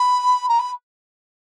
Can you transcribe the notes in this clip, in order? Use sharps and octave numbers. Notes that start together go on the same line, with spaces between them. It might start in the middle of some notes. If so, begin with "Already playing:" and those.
Already playing: B5
A#5
B5